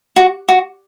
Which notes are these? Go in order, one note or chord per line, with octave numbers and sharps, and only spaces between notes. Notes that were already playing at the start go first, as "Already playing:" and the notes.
F#4
F#4